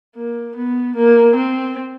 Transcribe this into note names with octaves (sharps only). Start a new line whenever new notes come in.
A#3
B3
A#3
C4